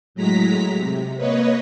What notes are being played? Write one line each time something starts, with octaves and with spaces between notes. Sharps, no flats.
A2 F#3 G#3 A#5 B6
C3
A#3 B4 C#5 D#5